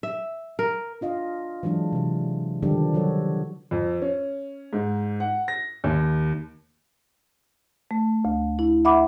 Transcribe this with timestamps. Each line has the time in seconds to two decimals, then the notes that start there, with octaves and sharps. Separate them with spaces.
0.03 E5
0.59 A#4
1.01 D4 F4 D#5 F5
1.63 E3 F#3 G#3 D4
1.93 C3 E3
2.63 D3 D#3 F3 G3 D4 G4
2.94 F#3 F#4 A4 C#5
3.71 F2
4.02 C#4
4.73 G#2
5.20 F#5
5.48 A#6
5.84 D#2
7.91 A3
8.25 D2
8.59 E4
8.85 E5 F#5 B5 D6